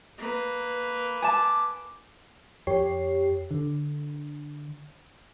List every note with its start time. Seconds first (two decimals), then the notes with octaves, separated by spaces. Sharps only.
0.19 A#3 B4
1.22 G#5 A5 D6
2.67 F2 G4 C#5 C7
3.51 D3